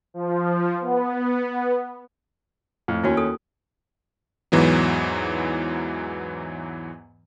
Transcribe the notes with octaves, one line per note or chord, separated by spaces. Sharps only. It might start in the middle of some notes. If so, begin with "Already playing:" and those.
F3
B3
F2 A2
D#2 C#4 E4 F#4 G#5
A4 D#6
E2 G#2 E3 F#3 B3